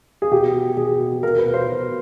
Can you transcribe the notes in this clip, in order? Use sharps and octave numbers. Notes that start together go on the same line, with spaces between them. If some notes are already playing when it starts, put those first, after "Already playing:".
G#4
B2 G4
B2
B2 G#4
B2
B2 A#4
B4
B2
C5
B2